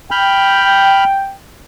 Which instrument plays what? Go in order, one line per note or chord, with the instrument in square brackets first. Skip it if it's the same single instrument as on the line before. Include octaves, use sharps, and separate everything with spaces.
[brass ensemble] G5 [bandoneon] B5 F6 G6